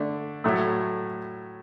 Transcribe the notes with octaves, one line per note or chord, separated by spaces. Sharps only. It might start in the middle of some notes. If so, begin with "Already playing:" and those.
Already playing: D3 A3 D4
A2 F#3 A3